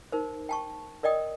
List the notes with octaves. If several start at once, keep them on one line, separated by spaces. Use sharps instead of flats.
D#4 A#4 C5
G5 A5 C#6
A#4 D5 D#5 G5 D#6